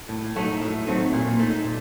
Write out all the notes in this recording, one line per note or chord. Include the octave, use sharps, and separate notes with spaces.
A2
F#3 A3 C4 D#4
A2
F#3 A3 C4 D#4
A#2
A3 D#4
A#2